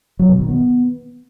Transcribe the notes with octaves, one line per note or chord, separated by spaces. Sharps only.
F#3
B2
D#3
B3